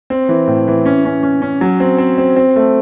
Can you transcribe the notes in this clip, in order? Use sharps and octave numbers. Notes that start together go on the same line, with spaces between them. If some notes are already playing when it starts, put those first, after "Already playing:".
C4
E3
A2
E3
C#4
C#4
C#4
C#4
F#3
C4
C4
C4
C4
A3